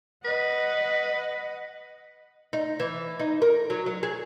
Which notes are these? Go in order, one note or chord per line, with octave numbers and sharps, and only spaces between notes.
B4 D#5 F#5
D#4
E3
D#4
A#4
F#3
F#3
G#4